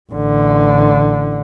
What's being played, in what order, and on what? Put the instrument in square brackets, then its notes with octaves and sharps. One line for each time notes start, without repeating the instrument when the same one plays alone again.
[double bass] A1 D3